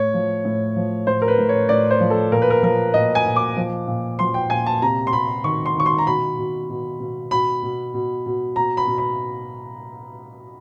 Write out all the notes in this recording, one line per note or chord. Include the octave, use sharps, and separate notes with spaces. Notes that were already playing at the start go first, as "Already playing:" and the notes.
Already playing: A2 C#5
F3
A2
F3
A2 C5
A#4
B4
A2
C#5
A2 D5
C5
F3
A4
A#2 A#4
B4
A#4
F3 A#4
A#2 D#5
G#5
A#2
D6
F3
A#2
F3 C6
G5
A#2 G#5
A5
C3 A#5
C6
C3 B5
D#3 C#6
C6
D#3 C#6
C6
A#5
B2 B5
B2
B2
B2
B2 B5
B2
B2
B2
B2 A#5
B5
B2
B5